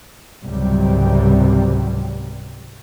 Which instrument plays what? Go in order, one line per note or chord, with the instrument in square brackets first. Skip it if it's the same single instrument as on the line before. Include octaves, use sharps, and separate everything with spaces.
[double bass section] G#1 C#2 C3 F#3 G3